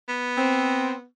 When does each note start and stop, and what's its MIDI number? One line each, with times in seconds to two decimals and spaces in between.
0.09 1.05 59
0.38 0.94 60